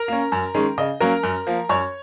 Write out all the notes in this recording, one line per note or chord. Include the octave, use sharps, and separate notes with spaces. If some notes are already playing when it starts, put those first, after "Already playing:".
Already playing: A#4 A#5
A#3 C#4
F#2
D#3 G#3 C#4
C#3 D#5
F#3 A#3 C#4 A#4 A#5
F#2
F3 A#3
F#2 C#5 C#6